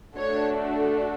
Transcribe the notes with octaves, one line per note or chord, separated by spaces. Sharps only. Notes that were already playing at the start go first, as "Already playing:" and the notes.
A3 D4 F#4 A4 C#5